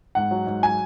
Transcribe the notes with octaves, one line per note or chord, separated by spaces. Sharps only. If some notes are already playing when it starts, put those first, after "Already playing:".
G#2 F#5
F#3
G#2
F#3 G#5